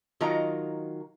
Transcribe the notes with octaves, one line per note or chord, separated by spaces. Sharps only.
D#3 F#3 F4 A#4 D#5 A#5